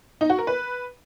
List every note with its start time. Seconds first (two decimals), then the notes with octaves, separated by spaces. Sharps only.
0.21 D#4
0.30 F#4
0.38 A#4
0.47 B4